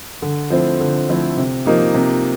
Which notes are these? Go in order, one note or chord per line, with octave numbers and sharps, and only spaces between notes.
D3
F3 A3 C4 E4
D3
F3 A3 C4 E4
C3
F3 A#3 D#4 G4
C3